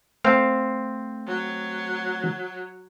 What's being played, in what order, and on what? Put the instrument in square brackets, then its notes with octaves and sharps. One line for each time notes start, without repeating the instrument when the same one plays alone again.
[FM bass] A3 [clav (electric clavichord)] C4 C5 F5
[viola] F#3